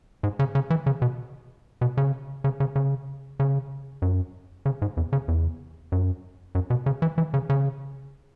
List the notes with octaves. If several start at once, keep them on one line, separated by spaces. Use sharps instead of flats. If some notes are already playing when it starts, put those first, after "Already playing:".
G#2
C#3
C#3
E3
C#3
B2
B2
C#3
C#3
C#3
C#3
C#3
F#2
C#3
G#2
E2
C#3
E2
F#2
F#2
B2
C#3
E3
E3
C#3
C#3